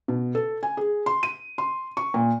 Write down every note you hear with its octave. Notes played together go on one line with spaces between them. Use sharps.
B2
A4
G#5
G#4
C6
D#7
C6
C#6
A#2